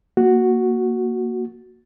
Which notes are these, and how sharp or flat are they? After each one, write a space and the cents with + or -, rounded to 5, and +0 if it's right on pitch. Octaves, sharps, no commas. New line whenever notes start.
A#3 +0 F#4 +0